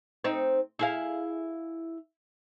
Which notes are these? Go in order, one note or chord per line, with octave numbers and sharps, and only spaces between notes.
C4 D#4
E4 G#4 F5